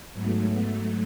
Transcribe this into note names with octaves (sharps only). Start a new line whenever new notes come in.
G#2 F#3 A3 B3
B3